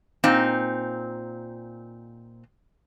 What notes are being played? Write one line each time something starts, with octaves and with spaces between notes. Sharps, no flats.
A#2 C4 D#4